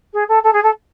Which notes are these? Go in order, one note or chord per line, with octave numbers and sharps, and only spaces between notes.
G#4
A4
A4
G#4
A4